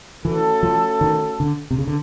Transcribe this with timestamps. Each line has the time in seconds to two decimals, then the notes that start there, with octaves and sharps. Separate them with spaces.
0.25 E3 A3 C#4 F#4 A4
0.63 F3
1.01 D#3
1.40 D3
1.71 C3
1.78 C#3
1.87 D3